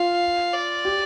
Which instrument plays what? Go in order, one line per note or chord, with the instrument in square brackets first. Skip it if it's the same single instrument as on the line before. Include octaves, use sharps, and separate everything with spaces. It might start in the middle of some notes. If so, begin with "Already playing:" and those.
Already playing: [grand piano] F4 [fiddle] F5
[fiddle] D5
[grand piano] G4